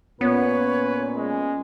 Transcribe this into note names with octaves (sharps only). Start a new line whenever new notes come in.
A#2 B3 C#4 B4 C#5
G#3